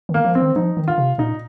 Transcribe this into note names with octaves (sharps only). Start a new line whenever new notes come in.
D#3
A#3
F3
C4
D#3
F3 D#4
D#3
F4
C3
A#2 D#4